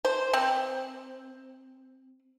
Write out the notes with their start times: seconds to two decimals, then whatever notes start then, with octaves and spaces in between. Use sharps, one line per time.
0.05 C5
0.33 C4